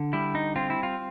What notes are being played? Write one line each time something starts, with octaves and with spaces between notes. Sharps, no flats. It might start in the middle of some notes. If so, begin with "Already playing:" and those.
Already playing: D3
G3 E4
D#4
C4 F4
E4
F4